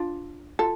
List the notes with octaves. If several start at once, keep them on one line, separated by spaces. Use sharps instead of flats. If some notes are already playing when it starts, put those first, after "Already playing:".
Already playing: D4 F4
F4 A4